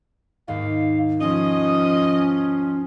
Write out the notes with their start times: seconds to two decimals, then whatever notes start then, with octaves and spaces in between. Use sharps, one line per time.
0.48 D#2 G#2 F5
1.20 F3 C#4 D#5